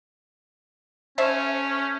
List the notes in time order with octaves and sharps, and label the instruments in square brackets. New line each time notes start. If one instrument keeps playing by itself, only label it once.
[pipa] A3 C5 E5 [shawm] C#4